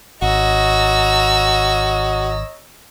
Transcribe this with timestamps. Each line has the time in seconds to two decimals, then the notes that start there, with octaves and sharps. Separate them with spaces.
0.22 G#1 F#4 C#5 D#5 A#5 E6